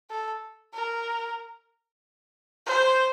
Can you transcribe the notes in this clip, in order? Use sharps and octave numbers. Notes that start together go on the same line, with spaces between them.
A4
A#4
C5